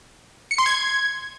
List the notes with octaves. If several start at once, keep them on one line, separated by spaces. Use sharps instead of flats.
C#7
C6
G#6